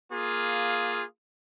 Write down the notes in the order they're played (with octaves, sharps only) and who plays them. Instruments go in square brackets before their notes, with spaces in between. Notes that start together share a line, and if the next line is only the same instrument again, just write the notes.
[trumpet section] A#3 F4 G#4